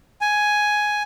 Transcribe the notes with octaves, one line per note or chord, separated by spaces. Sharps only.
G#5